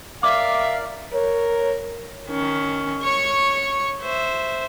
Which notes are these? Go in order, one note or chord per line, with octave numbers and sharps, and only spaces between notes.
A#4 D5 E5 F5 D6
A#4 C#5
D#3 C#4
C#5 C#6
C5 E5